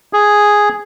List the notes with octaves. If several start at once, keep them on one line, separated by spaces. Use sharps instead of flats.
G#4